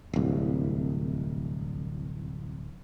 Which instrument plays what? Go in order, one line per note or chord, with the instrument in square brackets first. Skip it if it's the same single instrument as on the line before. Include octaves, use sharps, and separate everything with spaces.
[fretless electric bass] D1 C2